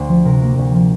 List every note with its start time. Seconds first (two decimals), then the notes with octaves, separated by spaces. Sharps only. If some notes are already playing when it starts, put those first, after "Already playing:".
Already playing: D2 C5
0.09 F3
0.25 C3 A#4
0.42 A#3
0.58 D2
0.74 F3